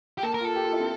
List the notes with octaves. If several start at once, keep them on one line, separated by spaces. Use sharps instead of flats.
G4
A#3 A4
A#4
F4 A4
G4
F4
E4
C4